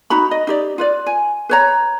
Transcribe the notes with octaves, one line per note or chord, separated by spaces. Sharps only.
D#4 F#4 A#5 B5
D#5
D#4 G4 D5
F4 B4 D5
G#5
B4 C#5 A#5